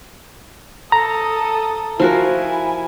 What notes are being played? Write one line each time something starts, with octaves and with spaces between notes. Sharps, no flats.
A4 A#5 D#6
F3 E4 F#4 A#4 G#5